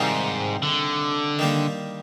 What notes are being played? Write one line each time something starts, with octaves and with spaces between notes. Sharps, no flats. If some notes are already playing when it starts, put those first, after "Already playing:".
Already playing: G#2 C3 D#3 G3 C4 F4
D3
D#3 G3 A#3